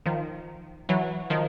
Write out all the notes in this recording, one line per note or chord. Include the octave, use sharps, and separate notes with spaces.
D#3 F3
E3 F#3
D#3 F3